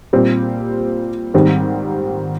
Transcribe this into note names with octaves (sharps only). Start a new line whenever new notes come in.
A#2 G3 C4
G#2 D#3 G3 C4